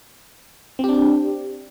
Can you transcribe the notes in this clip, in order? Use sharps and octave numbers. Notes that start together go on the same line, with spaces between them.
C4 D4 G4